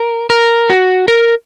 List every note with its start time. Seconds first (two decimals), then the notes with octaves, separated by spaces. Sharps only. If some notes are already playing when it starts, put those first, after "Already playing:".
Already playing: A#4
0.30 A#4
0.70 F#4
1.08 A#4